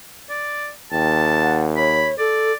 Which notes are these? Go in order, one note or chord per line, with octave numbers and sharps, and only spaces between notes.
D5
D#2 G5 A5
F#5
C#5 B5
A4 D5